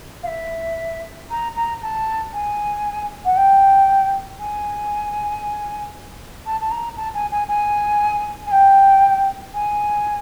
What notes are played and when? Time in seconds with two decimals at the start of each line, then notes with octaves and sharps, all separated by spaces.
0.23 F5
0.27 E5
1.30 A#5
1.56 A#5
1.82 A5
2.33 G#5
3.25 F#5
3.36 G5
4.39 G#5
6.46 A5
6.60 A5
6.71 A#5
6.97 A5
7.14 G#5
7.31 G#5
7.48 G#5
8.46 G#5
8.51 G5
9.54 G#5